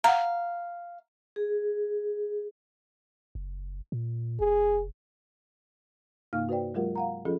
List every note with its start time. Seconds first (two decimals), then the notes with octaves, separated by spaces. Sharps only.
0.04 F5 F#5 A#5
1.36 G#4
3.35 F#1
3.92 A#2
4.40 F1 G#4
6.33 G2 C3 A#3 D#4 F5 F6
6.49 F#4 B4 C5 D5 G5
6.74 F#3 G#3 F4 G4 A#4 F#5
6.96 F5 F#5 A#5
7.25 F3 C#4 F4 G#4 A4 D#5